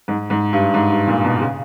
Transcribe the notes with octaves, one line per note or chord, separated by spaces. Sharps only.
G#2
G#2
G2
G#2
G2
A#2
B2
C#3